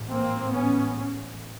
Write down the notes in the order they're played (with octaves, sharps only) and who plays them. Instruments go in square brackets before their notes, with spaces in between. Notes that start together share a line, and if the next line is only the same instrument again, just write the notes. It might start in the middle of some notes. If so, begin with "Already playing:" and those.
Already playing: [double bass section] A1 G#2
A#3 C4
B3 C#4